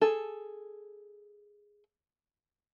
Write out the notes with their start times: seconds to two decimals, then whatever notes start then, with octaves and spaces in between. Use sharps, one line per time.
0.01 G#4 A4